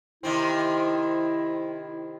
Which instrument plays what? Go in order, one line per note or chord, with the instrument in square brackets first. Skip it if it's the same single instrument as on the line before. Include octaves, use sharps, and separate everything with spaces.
[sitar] C3 D#3 C4 [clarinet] E4